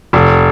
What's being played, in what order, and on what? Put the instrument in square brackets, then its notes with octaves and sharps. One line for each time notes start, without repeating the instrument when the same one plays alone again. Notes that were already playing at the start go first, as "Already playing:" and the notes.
[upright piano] F1